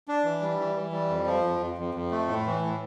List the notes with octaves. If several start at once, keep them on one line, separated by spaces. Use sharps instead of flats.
D4
E3
G3
E3
E3
G3
F2
F3
F2
F2
F2
F2
A3
A2
E3
A2